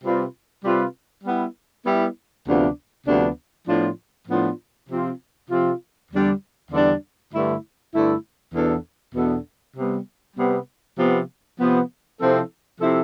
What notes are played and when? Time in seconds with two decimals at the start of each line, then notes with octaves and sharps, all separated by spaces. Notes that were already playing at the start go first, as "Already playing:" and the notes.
0.02 C3 G3 C4 F4 B4
0.63 C3 G3 C4 F4 B4
1.23 G3 B3 E4
1.84 G3 B3 E4
2.46 D2 C3 F3 B3 D4
3.06 D2 C3 F3 B3 D4
3.67 A2 F3 B3 D4 F4
4.28 A2 F3 B3 D4 F4
4.88 C3 F3 C4 F4
5.49 C3 F3 C4 F4
6.10 E2 D3 G3 D4
6.71 E2 D3 G3 D4
7.32 G2 D3 A3 E4
7.93 G2 D3 A3 E4
8.53 E2 B2 B3 D4 A4
9.15 E2 B2 B3 D4 A4
9.75 C3 G3 B3
10.36 C3 G3 B3
10.98 C3 F3 B3
11.58 C3 F3 B3
12.19 C3 F3 C4 E4 A4
12.80 C3 F3 C4 E4 A4